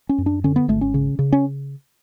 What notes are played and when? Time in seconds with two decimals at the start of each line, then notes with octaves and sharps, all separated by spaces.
0.09 C#4
0.18 F#2
0.26 D4
0.44 D3 C#4
0.56 B3
0.68 G#1 A3
0.81 C#4
0.94 C#3
1.19 C#3
1.32 C#4